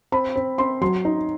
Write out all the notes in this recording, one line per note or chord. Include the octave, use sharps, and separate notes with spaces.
C4 B5
C4
C4 C6
F#3 C6
D#4